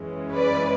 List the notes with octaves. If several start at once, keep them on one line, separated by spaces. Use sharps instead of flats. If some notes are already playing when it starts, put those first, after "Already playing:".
Already playing: F#2 E3 G#3 C#4
B4 D5